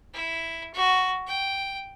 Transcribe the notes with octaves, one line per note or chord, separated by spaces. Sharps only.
E4
F#4
G5